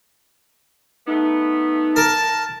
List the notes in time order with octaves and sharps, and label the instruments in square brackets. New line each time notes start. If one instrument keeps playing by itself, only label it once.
[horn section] A3 B3 [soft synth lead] D#4
[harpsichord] A#4 [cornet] A5